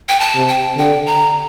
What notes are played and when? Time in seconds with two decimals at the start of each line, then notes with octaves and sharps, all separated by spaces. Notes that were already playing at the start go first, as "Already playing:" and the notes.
0.09 G5
0.20 A5
0.35 C3
0.49 G5
0.77 D3 G5
1.07 A#5